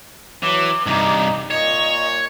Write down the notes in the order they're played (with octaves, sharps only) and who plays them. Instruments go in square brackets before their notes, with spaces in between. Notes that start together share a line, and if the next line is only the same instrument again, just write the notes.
[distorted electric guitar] E3 [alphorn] F#3 [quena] D6
[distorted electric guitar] G2 C3 [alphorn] D#4
[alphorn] A#2 [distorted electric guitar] C#5 [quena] D#5